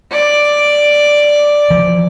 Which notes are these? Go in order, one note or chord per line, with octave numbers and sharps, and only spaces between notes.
D5
E3 F3